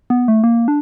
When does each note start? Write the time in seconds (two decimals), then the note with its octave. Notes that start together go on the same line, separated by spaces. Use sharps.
0.10 B3
0.28 A3
0.44 A#3
0.68 D4